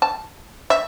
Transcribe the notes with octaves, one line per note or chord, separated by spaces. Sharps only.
A5
E5